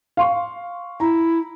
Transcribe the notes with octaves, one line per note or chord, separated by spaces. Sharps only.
F5 C6 C#6
E4 A#5